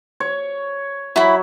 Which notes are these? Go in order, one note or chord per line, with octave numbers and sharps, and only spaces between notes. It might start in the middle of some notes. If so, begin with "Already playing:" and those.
C#5
F#3 E4 B5